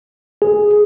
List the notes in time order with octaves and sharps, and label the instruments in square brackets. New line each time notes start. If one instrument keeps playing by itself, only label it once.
[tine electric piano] G#4